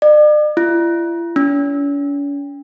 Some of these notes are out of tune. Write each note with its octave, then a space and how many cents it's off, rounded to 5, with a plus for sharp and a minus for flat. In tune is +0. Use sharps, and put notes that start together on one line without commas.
D5 +40
E4 +45
C#4 +45